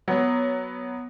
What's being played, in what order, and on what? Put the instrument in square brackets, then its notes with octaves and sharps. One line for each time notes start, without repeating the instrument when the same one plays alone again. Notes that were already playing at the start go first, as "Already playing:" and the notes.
[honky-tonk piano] F#3 B3